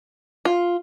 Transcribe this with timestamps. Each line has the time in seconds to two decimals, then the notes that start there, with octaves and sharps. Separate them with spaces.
0.45 F4